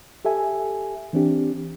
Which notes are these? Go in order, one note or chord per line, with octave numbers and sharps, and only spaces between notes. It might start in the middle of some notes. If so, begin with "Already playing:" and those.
G4 A4 E5 G#5
E3 C4 D4 G4